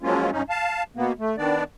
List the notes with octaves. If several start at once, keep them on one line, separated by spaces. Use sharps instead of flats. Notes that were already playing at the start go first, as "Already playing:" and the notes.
F3 F#3 G#3 A#3 C#4 F4
G2 C#4 D#4
F5 A5
B2 A#3 B3
A3
D#3 B3 D4 D5